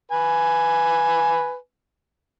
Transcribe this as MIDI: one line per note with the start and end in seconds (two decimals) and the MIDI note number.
0.11 1.55 71
0.11 1.55 80